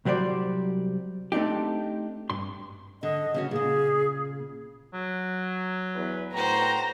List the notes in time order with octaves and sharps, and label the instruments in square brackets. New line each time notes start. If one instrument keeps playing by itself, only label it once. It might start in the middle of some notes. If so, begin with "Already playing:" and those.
[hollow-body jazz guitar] C2 F#3 G3 C5 D5
A3 C4 D4 D#4 G4
G2 C6
[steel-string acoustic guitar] D3 [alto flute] D#5
[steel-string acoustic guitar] C#3 C#4 F#4
[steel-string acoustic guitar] A#2 C#3 [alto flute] G#4
[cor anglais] F#3
[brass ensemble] E2 B4
[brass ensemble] A2 B4 G5 [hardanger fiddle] F#4 C5 [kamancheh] A#5